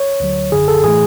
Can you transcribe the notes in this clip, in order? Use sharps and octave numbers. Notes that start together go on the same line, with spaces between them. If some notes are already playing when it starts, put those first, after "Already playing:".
Already playing: C#5
D2 D3 F#3
G#1 F#2 D3 G#4
A4
A2 E3 A3 G#4